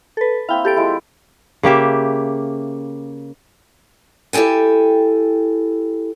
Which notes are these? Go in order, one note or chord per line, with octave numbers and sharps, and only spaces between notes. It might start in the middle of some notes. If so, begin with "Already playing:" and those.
A4 B4
A#3 C4 E4 F5 G5
G4 A4 G5 A5 D7
F3 G#3 E4
C#3 A#3 G4 E5
E4 G4 A4 G5 G#5